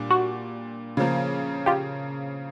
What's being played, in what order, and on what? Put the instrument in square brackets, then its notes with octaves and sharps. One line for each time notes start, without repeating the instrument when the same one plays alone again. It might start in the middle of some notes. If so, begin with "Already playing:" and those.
Already playing: [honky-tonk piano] A#2 G3 D4
[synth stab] F#4
[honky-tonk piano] C#3 F3 A#3
[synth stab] F4 G4